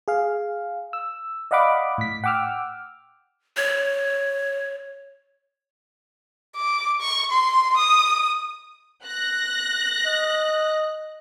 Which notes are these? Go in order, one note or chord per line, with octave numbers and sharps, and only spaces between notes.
G#4 F5
E6
D5 D#5 F5 F#5 B5 D6
A2 B6
F#5 G5 D6 E6 F6
C#5
D6
C#6
C6
D#6
F#6 A#6
D#5